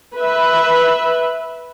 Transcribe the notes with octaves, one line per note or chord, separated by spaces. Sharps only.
B4 E5